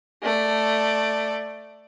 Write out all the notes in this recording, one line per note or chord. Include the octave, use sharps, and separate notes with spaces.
A3 D5